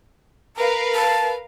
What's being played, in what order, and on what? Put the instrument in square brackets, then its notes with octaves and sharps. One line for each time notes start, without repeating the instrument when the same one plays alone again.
[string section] A#4 B4 F5 [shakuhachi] A#5
[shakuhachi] A5